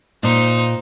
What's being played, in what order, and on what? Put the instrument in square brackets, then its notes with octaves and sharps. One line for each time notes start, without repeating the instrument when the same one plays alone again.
[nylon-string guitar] A#2 [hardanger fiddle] D#4 C5